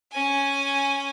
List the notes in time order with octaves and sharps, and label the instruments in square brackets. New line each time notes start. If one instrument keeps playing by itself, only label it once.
[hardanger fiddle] C#4 G#5